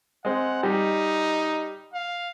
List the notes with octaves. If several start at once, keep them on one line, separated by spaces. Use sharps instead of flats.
G#3 C4 F#5
G3 D#4
F5